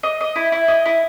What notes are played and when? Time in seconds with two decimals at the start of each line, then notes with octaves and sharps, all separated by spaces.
0.03 D#5
0.21 D#5
0.36 E4
0.52 E4
0.68 D#5
0.86 E4